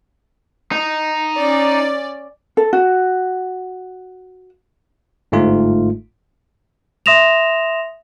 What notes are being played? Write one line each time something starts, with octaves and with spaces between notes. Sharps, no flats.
D#4
C#4 D5
A4
F#4
G1 G#2 A3 F4
E5 C6 D#6 A#6 E7 F7